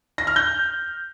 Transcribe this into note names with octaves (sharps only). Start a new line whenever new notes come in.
A#6
F6
G6